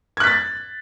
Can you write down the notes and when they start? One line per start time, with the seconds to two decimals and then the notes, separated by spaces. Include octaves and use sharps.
0.17 G#6
0.20 F#6
0.24 B6
0.27 A6